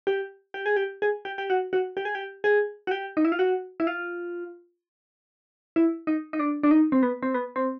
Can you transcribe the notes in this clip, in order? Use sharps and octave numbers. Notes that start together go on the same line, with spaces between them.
G4
G4
G#4
G4
G#4
G4
G4
F#4
F#4
G4
G#4
G4
G#4
F#4
G4
D#4
E4
F4
F#4
E4
F4
E4
D#4
D#4
D4
D4
D#4
C4
B3
C4
B3
C4